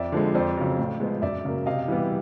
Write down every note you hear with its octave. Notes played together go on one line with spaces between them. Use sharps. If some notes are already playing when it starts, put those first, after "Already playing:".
Already playing: F2 D5 E5
D3 F3 G#3
F2 C5 D5
C#3 F#3
A2
F3 G#3 B3
F#2 D5 E5
C#3 F#3 A#3
C3 D#5 F5
E3 G3 B3